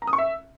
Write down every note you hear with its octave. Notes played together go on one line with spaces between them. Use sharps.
A#5
D#6
C#6
E5